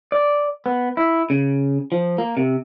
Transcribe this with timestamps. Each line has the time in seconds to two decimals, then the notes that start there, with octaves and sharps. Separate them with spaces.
0.12 D5
0.66 B3
0.97 E4
1.30 C#3
1.92 F3
2.18 A#3
2.37 C3